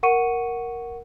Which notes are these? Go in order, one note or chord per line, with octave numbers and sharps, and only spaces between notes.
A#4 F#5 C#6 C#7 D#7